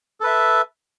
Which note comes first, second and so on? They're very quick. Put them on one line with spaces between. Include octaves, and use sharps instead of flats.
A4 B4 E5